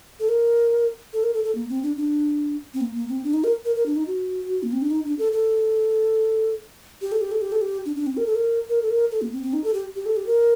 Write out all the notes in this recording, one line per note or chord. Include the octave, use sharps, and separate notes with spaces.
A4
A#4
A4
A#4
A4
A4
A#3
C4
D4
D4
C4
A#3
A#3
C4
D4
D#4
A#4
A#4
A#4
D4
D#4
F#4
A#3
C4
D4
D#4
D4
A4
A4
G4
A4
G4
A4
G4
A4
G4
D4
D4
C4
A#4
A4
A#4
A#4
A4
A#4
A4
A#3
C4
C4
D#4
A4
G4
G4
A4
G4
A#4